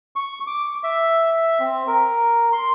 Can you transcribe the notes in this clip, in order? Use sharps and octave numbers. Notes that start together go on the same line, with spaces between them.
C#6
D6
E5
C4
A#4
C6